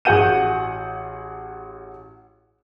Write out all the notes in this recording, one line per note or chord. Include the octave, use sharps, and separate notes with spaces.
A1 F#4 G#4 F#5 G6 D#7